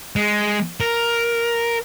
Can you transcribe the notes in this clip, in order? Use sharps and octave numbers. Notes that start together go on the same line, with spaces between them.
G#3
A#4